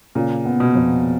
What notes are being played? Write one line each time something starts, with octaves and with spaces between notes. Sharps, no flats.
A#2 C#3
B3
B2
F2